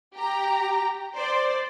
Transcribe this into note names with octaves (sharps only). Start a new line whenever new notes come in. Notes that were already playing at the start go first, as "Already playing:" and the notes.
G4 A#5
C5 D5